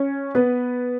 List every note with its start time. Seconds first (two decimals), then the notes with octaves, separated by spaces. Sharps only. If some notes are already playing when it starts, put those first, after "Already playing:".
Already playing: C#4 C#5
0.35 B3 B4